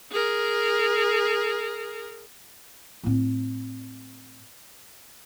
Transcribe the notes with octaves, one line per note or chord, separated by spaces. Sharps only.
G#4 A#4
A2 C4